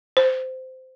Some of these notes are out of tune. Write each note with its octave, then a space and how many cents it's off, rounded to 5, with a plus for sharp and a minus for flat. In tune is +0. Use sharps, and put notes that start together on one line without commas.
C5 -15